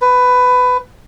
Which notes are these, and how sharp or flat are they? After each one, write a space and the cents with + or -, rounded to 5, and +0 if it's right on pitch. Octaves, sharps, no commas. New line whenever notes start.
B4 +15